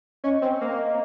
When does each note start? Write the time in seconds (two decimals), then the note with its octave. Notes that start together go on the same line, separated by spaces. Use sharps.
0.24 C#4 D#5
0.42 C4
0.61 A#3
0.78 D#5